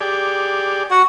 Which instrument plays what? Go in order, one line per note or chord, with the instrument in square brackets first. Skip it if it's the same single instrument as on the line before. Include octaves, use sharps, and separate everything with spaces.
[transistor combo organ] G4 G#4 D5
[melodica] F#4 F#5